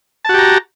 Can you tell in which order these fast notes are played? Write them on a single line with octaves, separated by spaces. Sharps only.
A5 F#4 G4 A#5